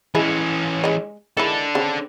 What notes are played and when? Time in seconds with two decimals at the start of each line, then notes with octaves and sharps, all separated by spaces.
0.15 E3 G#3 C#4 E4 G#4
0.84 G#3 D#5
1.37 D#3 G#3 D4 E4 A4
1.75 C#3 C4